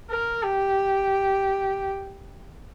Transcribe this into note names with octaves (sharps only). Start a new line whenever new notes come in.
A#4
G4